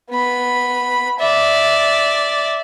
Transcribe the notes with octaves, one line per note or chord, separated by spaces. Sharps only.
B3 B5
D5 E5